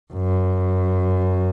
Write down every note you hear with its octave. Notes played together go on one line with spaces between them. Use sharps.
F#2